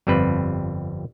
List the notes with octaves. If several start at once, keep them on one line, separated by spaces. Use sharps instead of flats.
G1 F2 G3 C4 B4